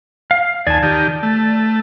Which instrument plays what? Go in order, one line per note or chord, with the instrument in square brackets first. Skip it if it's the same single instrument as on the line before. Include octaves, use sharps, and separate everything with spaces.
[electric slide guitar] F5
[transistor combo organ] D#2 G#5 [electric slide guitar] D5 A5
[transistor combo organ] D#3 G4
A3